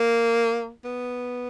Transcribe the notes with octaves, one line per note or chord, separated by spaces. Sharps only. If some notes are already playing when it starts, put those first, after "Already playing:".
Already playing: A#3
B3